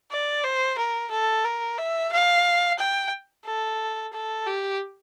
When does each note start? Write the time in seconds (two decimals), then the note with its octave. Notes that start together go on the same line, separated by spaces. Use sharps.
0.11 D5
0.44 C5
0.78 A#4
1.11 A4
1.44 A#4
1.78 E5
2.12 F5
2.79 G5
3.45 A4
4.13 A4
4.46 G4